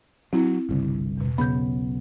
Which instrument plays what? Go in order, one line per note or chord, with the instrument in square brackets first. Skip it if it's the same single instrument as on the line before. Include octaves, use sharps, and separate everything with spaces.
[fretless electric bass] F#3 [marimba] C4 E4
[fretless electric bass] G1 C2 [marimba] C#3
[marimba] E2 B2
[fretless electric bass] B1 C#3 B3 [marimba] B5 G6